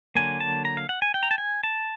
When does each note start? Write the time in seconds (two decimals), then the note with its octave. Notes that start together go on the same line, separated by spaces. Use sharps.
0.15 D3 F#3 A#3 G#5
0.40 A5
0.65 A#5
0.77 F5
0.89 F#5
1.02 G#5
1.14 G5
1.23 A#5
1.31 A5
1.38 G#5
1.63 A5